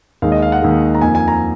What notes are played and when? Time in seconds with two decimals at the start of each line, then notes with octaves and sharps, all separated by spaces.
0.22 D#2 D#3 G#3 F5
0.32 D#5
0.42 F5
0.52 F#5
0.62 D#2 D#3 G#3
0.95 A#5
1.01 F2 D#3 A#3 G#5
1.15 G#5
1.28 A#5